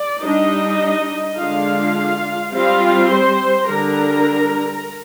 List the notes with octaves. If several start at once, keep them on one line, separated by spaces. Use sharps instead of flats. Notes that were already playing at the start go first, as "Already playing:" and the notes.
Already playing: D5
G3 D4 D#4 D#5
D3 G#3 D4 F4 F5
G3 C4 F4 F5
C5 C6
D3 G3 D4 A#4 A#5